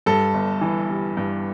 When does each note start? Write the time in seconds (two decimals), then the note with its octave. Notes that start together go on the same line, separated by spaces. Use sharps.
0.06 G2 A4
0.34 G1
0.61 E3
0.89 G3
1.17 G2